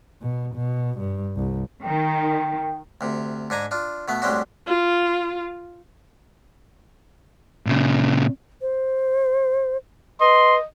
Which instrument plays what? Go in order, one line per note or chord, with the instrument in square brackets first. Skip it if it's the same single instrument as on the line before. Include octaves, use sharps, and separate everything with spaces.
[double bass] B2
B2
G2
C2
[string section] D#3 [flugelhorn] G5
[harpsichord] D2 C3
G#2 D4 G#5 A#5
D4 F4
B2 A3 B3
A2 G3 G#3 C4 D4 F#4
[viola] F4
[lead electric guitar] A#2 C#3
[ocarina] C5
[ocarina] B4 [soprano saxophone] D#5 [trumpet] C6